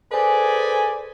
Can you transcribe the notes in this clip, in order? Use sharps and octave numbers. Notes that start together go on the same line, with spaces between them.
G#4 A4 B4 C5 D5 G#5